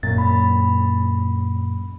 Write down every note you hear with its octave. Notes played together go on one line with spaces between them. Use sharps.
F#2 A#2 A6
B5 B6